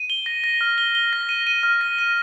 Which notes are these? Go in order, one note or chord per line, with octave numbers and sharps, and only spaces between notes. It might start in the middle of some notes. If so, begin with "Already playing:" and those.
Already playing: D#7
G7
A#6
A#6
F6
G7
G7
A#6
D#7
D#7
F6
A#6
D#7